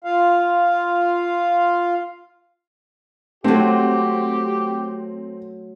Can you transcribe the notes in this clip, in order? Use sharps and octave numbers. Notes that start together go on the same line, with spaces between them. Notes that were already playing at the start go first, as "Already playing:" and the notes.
F4 F5
F#3 A3 C4 G4